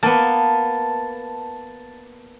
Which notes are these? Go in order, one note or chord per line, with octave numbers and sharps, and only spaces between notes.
A#3 B3 A5